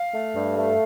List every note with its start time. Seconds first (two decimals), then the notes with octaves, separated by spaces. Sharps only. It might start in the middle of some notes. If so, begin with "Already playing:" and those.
Already playing: F5
0.14 A3
0.36 G2
0.57 A3